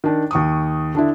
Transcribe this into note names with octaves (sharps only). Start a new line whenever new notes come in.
D#3 D4
D#2 C#6 D#6
D3 D4 E4